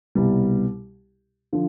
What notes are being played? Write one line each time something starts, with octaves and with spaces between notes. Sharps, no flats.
C2 B2 G3
D3 F3